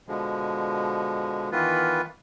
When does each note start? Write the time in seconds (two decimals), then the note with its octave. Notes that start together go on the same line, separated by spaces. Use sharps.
0.08 B2 D3 F3 G#3
1.52 D#3 E3 B3 F4 B4